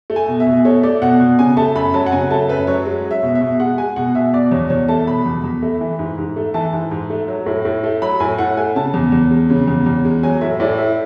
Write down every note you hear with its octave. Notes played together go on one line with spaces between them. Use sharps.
A3
G#5
B2
E5
B2
A3 C#5
A3 D5
B2 F#5
B2
C#3 G#5
A3 A5
F#2 B5
F#3 A5
F#5
C#3 G#5
A3 A5
F#2 B4
F#3 C#5
G#3
G#3
E5
B2
E5
B2
G#3 F#5
G#3 G#5
B2 F#5
B2 E5
B2 D5
E2 C#5
E2 C#5
A3 A5
B2 B5
E2
E2
A3
E3
G#2
G#2
A3
E3 A5
G#2
G#2
A3
F#3
A2
A2
A3
F#3 B5
A2 G#5
A2 F#5
A3 G#5
C#3 A5
E2
E2
G#3
C#3
E2
E2
G#3
F#3 G#5
A2 E5
A2 D5
A3 E5